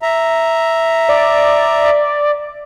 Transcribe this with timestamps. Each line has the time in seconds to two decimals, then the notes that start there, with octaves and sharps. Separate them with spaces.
0.02 E5 A#5
1.09 D5